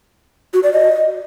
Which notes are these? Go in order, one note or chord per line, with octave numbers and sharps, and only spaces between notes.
F#4
D5
D#5